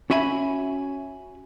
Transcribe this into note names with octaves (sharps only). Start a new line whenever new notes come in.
C#4 F#4 E5 G#5 B5